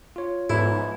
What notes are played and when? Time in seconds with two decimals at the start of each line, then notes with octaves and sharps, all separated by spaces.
0.16 F4 C#5
0.50 G#2 F3 B3 E4 A4